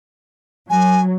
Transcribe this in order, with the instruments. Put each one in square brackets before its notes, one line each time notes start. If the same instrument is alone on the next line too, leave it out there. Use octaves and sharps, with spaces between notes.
[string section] F#3 [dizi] G#5